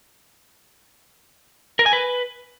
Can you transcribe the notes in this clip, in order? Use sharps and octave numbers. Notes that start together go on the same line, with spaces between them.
A#4
G#5
B4